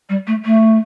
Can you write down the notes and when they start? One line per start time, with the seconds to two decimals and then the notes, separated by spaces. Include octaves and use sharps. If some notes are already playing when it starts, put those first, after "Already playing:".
0.09 G3
0.27 A3
0.45 A3